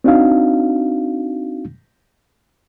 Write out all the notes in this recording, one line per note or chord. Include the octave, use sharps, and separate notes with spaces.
C4 D4 D#4 F#4 F5